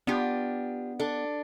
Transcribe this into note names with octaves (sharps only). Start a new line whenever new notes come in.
B3 D4 F4 G4
D4 A4